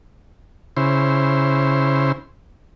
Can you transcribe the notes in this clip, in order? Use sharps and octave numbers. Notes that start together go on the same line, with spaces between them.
C#3 E4 C5